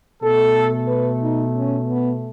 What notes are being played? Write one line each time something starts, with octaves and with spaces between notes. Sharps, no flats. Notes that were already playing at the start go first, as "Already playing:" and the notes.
B2 A3 A4
B4
D#4
C#4
B3